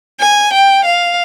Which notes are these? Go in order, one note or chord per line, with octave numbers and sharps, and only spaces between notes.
G#5
G5
F5